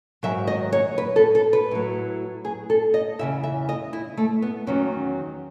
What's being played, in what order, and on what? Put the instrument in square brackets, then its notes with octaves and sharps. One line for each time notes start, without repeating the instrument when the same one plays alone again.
[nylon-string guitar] G#2 D#3 F#3 E5
D#5
C#5
B4
A4
A4
B4
A2 F#3
G#4
A4
D#5
E2 C#3 E3 E5
E5
D#5
E4
A3
B3
E2 D#3 F#3 C#4